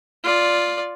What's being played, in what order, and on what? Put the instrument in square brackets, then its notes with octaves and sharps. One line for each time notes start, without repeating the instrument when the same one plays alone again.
[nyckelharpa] F4 D5